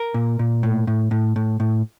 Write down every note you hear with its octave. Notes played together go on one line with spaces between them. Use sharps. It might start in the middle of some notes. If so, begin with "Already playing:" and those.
Already playing: A#4
A#2
A#2
A2
A2
A2
A2
A2